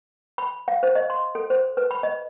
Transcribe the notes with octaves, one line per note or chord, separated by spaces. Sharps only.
B5
F5
C5
D#5
C6
A4
C5
B4
B5
D#5